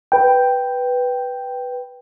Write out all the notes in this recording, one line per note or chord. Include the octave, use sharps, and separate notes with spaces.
B4 G5